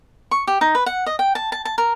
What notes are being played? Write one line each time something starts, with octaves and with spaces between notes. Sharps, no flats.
C#6
G4
D#4
B4
F#5
D#5
G5
A5
A5
A5
A#4